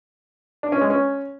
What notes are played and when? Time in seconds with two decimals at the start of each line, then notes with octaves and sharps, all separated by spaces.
0.63 D4
0.72 C#4
0.81 G#3
0.90 C#4